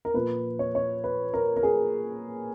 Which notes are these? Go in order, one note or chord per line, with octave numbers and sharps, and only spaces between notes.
A#4
A#2 F3 B4
C#5
C#5
B4
A#4
A#4
G#4